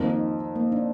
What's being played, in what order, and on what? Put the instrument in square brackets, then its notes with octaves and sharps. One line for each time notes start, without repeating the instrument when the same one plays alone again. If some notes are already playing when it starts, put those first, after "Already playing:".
Already playing: [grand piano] F2 D#3 A#3
[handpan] D#4
A#3
D4